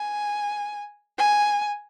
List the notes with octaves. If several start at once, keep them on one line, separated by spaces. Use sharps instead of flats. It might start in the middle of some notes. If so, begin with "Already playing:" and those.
Already playing: G#5
G#5